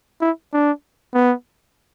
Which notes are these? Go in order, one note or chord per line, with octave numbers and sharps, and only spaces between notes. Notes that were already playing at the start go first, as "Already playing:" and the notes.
E4
D4
B3